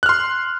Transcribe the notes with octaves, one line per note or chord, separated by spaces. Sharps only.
C6 F6 F#6